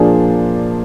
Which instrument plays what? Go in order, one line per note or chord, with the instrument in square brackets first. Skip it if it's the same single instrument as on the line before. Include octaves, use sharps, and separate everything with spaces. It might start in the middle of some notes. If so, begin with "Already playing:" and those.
Already playing: [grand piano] A#2 F3 A#3 D4 G#4